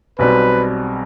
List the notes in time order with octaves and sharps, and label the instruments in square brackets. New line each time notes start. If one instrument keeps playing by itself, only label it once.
[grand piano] B1 B2 G3 C4 [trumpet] B4